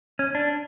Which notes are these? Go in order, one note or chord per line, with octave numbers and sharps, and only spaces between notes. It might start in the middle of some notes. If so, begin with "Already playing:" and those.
C#4
D4